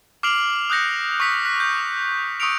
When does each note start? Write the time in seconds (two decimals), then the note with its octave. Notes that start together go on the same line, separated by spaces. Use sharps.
0.23 D6 F6 C7 D7 F7 F#7
0.70 D#6 F#6 G6 A#6 C#7
1.20 C#6 D#6 B6 C#7
1.45 F#6 B6
1.60 G6
2.40 C#6 D#6 E6 C#7 D7 F7